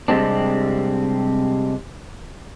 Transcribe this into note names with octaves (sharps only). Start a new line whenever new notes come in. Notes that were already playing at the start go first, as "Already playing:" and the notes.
C3 G3 G#3 C4 D4